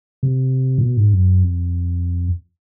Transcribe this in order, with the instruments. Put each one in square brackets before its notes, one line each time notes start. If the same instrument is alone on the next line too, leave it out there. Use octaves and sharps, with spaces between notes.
[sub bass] C3
A#2
B2
G#2
F#2
F2